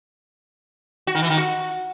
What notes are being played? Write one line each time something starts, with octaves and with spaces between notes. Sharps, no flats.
F#4
D#3
E3
D#3
F#4